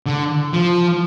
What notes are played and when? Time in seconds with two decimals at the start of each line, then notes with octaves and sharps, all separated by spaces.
0.06 D3
0.53 F3